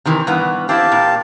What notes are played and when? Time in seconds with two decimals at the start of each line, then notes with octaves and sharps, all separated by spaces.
0.05 C3 D#3 E3
0.27 G2 E3 B3
0.69 C4 E4 G4 F5 A5
0.92 A#2